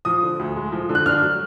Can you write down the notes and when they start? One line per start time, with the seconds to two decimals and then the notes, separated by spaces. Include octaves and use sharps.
0.05 F3 D#6
0.22 D3
0.39 D2
0.56 G#3
0.72 F3
0.89 D3
0.95 F#6
1.06 D4 F6
1.22 F#3